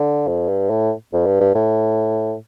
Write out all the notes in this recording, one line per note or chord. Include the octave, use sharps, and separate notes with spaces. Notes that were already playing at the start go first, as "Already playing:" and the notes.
Already playing: D3
F2
G2
A2
F2
G2
G2
A2